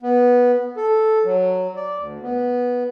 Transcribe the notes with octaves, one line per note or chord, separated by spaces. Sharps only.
B3
A4
F#3
D5
D2
B3